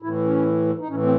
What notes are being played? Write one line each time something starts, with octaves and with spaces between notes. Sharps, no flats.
A2 E3 E4
C#4
D#4
A2 E3 C#4
C4